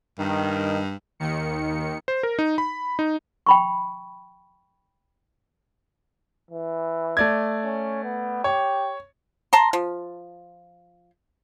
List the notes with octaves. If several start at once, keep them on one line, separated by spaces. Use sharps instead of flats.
G2 D#3
D#2 D#3 C#7
C5
A#4
D#4
B5
D#4
G5 B5 C#6
E3
A3 D5 G#6
C#4
B3
G4 C#5
A5 A#5 C6
F3